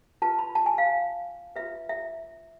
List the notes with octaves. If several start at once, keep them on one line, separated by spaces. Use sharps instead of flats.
F4 B4 A5
B5
A5
G#5
F5
F4 B4 E5
E5